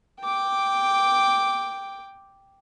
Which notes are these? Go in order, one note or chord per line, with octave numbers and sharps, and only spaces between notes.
G5 D6